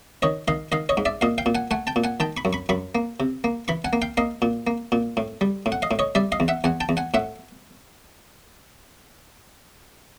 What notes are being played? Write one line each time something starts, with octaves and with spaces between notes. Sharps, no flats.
D#3 C#5 D#5
D#3 D#5 F5
D#3 D#5 F5
C#5 D#5
G#2
D5 E5
A#2 D#5 F5
F5 G5
A#2
F#5 G#5
A3 F#5 G#5
G5 A5
A#2
F#5 G#5
D#3 G5 A5
B5 C#6
F#2
B5 C#6
F#2 B5 C#6
A#3
C3
A#3
E3 B5 C#6
F#5 G#5
A#3
F5 G5
A#3 D#5 F5
A#2
A#3
A#2
A2
G3
A2
F#5
D#5 F5
A2
C#5 D#5
G3 D5 E5
D#5 F5
E2
E5 F#5
E2 F#5 G#5
G5 A5
E2
F#5 G#5
A2 E5 F#5